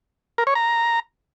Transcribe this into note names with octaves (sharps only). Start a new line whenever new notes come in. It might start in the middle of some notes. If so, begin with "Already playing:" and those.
A#4
C#5
A#5